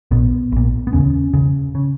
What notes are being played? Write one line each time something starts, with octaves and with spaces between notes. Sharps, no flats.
A#1 A#2 B3
A#1 A#2
B3
E1 D#2 C#3 C#4
E1 D#2 C#3
C#3